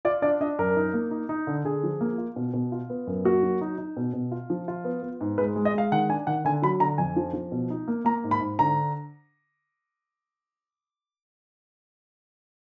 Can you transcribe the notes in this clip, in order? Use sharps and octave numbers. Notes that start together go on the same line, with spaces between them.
F4 D5
D4 D5
D4 D#5
F#2 A#4
D#4
A#3
D#4
D#4
D3
D3 G#4
F3
A#3
F4
B2
B2
F4
B3
F#2
A#3 F#4
F#3
D#4
D#4
B2
B2
F4
F3
F4
B3
B3
G#2
G#3 B4
G#3
D#5
G#3 F5
D#3 F#5
D4 G#5
D#3 F#5
D3 G#5
F#3 B5
D3 A#5
F2 G#5
F3
F3
B2
D#4
A#3
A#3 A#5
G#2
B5
G#2
D3 A#5